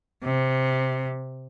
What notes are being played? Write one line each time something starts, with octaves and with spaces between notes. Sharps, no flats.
C3